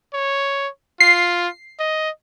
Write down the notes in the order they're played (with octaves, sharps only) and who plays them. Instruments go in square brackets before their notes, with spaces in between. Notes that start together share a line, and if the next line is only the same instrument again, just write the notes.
[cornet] C#5
[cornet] F4 [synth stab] C7
[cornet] D#5